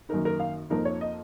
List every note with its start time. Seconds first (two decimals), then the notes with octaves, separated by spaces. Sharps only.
0.09 F#2 D#3 A#3 D#4 A#4
0.25 A#4
0.40 F5
0.70 F2 F3 A#3 D#4 A#4
0.85 C#5
1.01 D#5